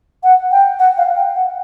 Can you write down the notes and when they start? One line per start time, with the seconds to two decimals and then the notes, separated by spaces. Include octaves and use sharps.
0.23 F#5
0.51 G5
0.79 F#5
0.98 F5
1.16 G5
1.35 F#5